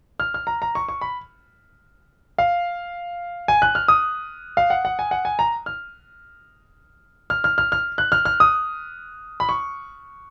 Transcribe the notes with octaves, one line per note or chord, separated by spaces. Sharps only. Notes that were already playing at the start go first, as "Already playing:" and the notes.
F6
F6
A#5
A#5
C#6
C#6
B5
F5
G#5
F#6
F6
D#6
F5
F#5
F#5
G#5
F#5
G#5
A#5
F6
F6
F6
F6
F6
F#6
F6
F6
D#6
B5
C#6